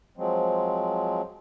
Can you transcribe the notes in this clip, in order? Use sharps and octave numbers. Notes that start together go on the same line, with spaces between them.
F3 F#3 G#3 C4